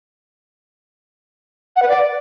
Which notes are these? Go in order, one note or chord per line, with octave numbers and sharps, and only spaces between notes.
F#5
B4
D5